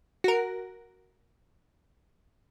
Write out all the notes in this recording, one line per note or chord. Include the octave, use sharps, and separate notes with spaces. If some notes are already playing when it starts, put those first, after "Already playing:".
F#4 A#4